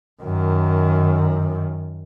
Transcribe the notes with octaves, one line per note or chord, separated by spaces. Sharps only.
F#2 D#3